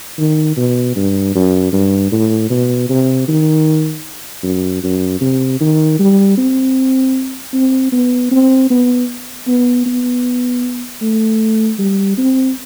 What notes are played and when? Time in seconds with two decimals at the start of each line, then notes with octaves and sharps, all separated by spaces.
0.18 D#3
0.57 B2
0.96 G2
1.35 F#2
1.73 G2
2.12 A2
2.50 B2
2.89 C3
3.28 D#3
4.43 F#2
4.83 F#2
5.21 C3
5.60 D#3
5.99 G3
6.38 C4
7.53 C4
7.92 B3
8.31 C4
8.70 B3
9.47 B3
9.86 B3
11.01 A3
11.79 G3
12.18 C4